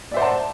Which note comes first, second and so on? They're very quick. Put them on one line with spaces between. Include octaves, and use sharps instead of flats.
D5 E5 C5 F#5 A5